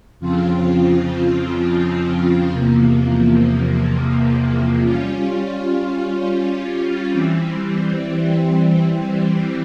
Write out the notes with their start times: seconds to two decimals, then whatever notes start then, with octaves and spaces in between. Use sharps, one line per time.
0.19 F2 C#3 F3 C4 F4
2.51 E2 C3 F3 A#3
4.80 G3 C#4 F4
7.10 E3 G3 C4